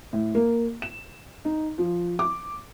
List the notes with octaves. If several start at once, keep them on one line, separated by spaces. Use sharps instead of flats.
A2
A#3
E7
D#4
F3
D6